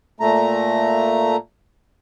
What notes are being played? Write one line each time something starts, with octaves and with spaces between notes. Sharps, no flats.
A#2 A3 A#5